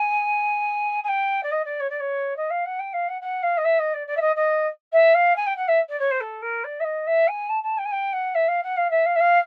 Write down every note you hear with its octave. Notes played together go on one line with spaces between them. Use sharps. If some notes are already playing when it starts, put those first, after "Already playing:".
Already playing: G#5
G#5
G5
D5
D#5
D5
C#5
D5
C#5
D#5
F5
F#5
G5
F5
F#5
F#5
F5
D#5
E5
D#5
D5
D5
E5
D#5
D#5
E5
F5
G#5
G5
F#5
E5
D5
C#5
C5
A4
A#4
D5
E5
D#5
E5
G#5
A5
A5
G5
G#5
G5
F#5
E5
F5
F#5
F5
E5
F5
E5
F5